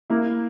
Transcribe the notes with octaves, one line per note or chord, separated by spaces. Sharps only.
A#3 E4